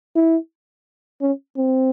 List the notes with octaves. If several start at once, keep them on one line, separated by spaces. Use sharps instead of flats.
E4
C#4
C4